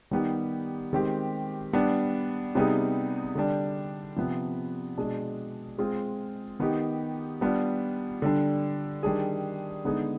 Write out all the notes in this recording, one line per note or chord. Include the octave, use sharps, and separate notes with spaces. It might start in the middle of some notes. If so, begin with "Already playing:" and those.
D#3 G3 B3 D#4 G4
D#3 G#3 C4 G4
G3 B3 D4
C3 G3 B3 D#4 G#4
D3 G3 D4
C3 F3 B3
B2 G#3 D4 G#4
G#3 C4 F4 G#4
D#3 B3 D#4 G4
G3 B3 D4 F4
D3 G3 D4
D#3 G3 D4 G#4
D3 G#3 B3 D#4 G#4